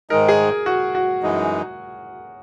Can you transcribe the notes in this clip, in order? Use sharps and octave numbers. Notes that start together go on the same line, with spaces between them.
G#2 D#3 G#3 D#4 A#4
G#4
F#4
F#4
F#2 E3 G#3 D#4